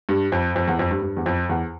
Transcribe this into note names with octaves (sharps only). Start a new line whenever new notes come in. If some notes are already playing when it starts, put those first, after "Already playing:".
G2
F2
F2
E2
F2
G2
G2
E2
F2
E2